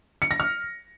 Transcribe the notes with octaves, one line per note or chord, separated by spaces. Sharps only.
C#7
A#6
F6